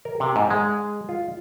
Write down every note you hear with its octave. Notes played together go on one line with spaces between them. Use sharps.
A#4
C3
G#2
G#3
F4